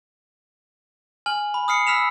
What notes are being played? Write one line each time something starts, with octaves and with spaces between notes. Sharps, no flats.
G#5 F6 F#7
B5
D#6 F6 C7 C#7
B5 E6 F6 B6 E7 F7